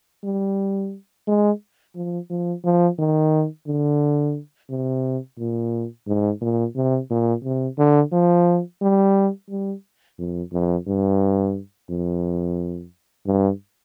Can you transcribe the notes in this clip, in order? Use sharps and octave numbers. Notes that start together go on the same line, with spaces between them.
G3
G#3
F3
F3
F3
D#3
D3
C3
A#2
G#2
A#2
C3
A#2
C3
D3
F3
G3
G3
F2
F2
G2
F2
G2